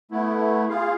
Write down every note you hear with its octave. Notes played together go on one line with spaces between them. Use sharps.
A3 B3 E4
F4 G#4 F5